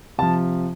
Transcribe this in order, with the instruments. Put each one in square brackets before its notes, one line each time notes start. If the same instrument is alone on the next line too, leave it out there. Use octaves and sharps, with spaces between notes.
[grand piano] C3 F3 A5